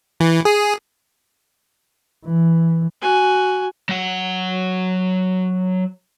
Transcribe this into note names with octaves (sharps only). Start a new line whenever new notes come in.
E3
G#4
E3
F#4 G#5
F#3 F#5